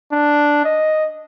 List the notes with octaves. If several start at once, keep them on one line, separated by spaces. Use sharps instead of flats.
D4
D#5